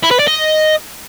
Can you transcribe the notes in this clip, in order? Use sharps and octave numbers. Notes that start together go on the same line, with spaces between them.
E4
B4
D5
D#5